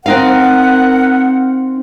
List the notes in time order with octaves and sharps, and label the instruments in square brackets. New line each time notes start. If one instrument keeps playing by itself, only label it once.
[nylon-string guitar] C4 D#4 F5 [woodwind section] A#4 F#5